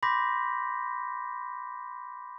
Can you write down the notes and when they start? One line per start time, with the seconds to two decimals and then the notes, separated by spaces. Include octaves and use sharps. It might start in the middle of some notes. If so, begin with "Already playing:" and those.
0.03 B5 C6 D6 G6 A#6 B6